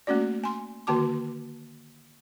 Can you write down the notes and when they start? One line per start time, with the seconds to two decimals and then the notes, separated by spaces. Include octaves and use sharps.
0.07 A3 A#3 C#4 F#4 D5
0.44 G#5 C6
0.87 D3 D#3 A#3 F#4 A5 D6